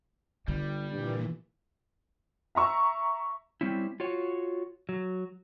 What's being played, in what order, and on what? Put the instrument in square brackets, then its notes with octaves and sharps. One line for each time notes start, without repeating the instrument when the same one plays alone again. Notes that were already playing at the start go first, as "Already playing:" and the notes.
[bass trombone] G1 [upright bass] D3 [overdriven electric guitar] G3
[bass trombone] G2 [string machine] A#2 E3
[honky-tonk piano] E5 A#5 C#6 E6
[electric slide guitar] G3 C4 C#4 E4
F4 F#4 C#5
F#3